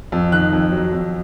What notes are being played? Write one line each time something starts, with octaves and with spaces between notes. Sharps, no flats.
F2
D#3 F#6
F2
F#3
F2